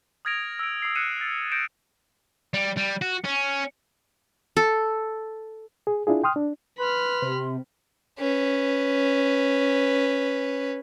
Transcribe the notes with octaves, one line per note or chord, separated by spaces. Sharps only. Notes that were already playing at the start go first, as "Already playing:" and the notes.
D#6 F6 G#6 A#6 D7 F7
E6 A#6 D7
D#6 C7
F6 F#6 C7 C#7 D#7 E7
A6
F#6 G6 A#6 C#7 D7 E7
G3
G3
F#4
C#4
A4
G#4
D4 E4 F4 G#4
G5 C6 D#6 F6
D4
B4 B5 C6 F6
C3
C#4 B4